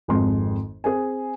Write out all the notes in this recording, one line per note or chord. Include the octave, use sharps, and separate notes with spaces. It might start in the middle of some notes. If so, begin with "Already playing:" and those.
G#1 F2 G#3 C6
C4 G#4 C5 G#5